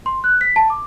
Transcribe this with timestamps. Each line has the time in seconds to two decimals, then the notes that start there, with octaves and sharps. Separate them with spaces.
0.06 C6
0.24 F#6
0.41 B6
0.56 A5
0.70 D6